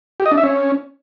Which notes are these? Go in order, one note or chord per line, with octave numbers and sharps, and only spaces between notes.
G4
D#5
D4
E5
C#4